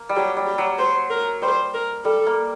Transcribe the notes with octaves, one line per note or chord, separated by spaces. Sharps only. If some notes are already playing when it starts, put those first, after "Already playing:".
Already playing: A#3
G3
F#3 G4
G3
G4
F#3
C5
A#4
G3 C5
A#4
G3 A4
A#3